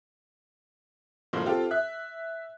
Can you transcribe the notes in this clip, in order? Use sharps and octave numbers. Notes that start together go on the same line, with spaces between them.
F#1 A2 F3 A#3 C6
C4 F4 G4 A4
E5 F#6